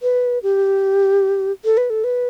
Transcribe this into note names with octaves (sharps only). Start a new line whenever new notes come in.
B4
G4
A4
B4
A4
B4